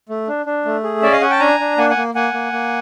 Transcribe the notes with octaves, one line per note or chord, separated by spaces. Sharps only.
A3
D4
D4
A3
G#4
C#4 D5 E5
D#5 F5
C#4 F#5 G#5
G5 A5
D4 G#5 A#5
D4
A#3 F#5 G#5
F#5 G#5
A#3
A#3 F#5 G#5
A#3
A#3